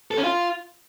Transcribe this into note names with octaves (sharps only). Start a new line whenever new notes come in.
A4
C#4
F4